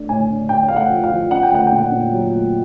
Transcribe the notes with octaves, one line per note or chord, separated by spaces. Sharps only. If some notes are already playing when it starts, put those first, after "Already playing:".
Already playing: A3 D4
A2 G#5
D4
A2 G5
A3 F5
F#5
F3
F5
F3
C#4 F#5
G5
A3 F#5
G5
A#2
F#5
A#2
F#3
A3